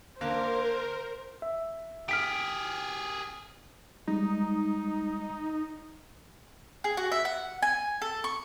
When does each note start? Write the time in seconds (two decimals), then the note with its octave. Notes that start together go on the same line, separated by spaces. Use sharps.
0.21 D3 A#3 A#4 C5
1.42 E5
2.09 G4 G#4 F6 B6 D7
4.08 G3 G#3 D#4
6.84 G#4
6.97 F#4
7.12 E5
7.25 F#5
7.62 G#5
8.02 A4
8.24 C#6